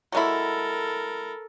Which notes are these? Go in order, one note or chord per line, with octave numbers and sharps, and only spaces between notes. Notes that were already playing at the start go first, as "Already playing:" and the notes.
F#3 G#3 E4 A4 A#4